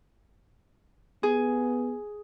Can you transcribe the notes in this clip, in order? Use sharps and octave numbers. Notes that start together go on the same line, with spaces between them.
B3 G#4